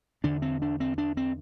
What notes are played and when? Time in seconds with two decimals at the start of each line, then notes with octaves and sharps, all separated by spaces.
0.24 E2 D3 D4
0.42 C4
0.62 D4
0.80 C4
0.98 D4
1.17 C4